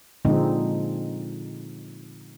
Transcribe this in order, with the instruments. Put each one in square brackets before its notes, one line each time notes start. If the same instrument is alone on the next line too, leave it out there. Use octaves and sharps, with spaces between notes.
[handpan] A#2 D3 F3 G#3 C4 D#4